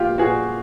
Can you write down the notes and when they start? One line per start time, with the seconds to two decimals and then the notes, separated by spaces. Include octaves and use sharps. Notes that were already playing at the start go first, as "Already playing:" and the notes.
Already playing: A#2 F3 F4 G4
0.18 A#2 F#4 G#4